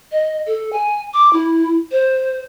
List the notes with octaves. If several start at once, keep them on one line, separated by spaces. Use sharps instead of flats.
D#5
A4
G#5
D6
E4
C5